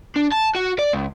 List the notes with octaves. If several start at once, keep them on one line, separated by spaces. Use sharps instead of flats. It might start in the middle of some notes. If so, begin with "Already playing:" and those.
D4
A5
F#4
D5
C#2